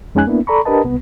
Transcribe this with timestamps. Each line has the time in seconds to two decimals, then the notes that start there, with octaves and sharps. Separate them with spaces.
0.15 F2 G#3 C#4 D#4 G#5 F#6
0.27 A#3 B3 D4 E4
0.47 A4 D5 A#5 B5 C#6
0.65 D4 G4 A#4 B4 D#5 A5
0.84 C2 B3